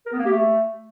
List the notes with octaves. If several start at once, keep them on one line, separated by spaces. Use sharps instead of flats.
A#4
B3
A#3
G4
A3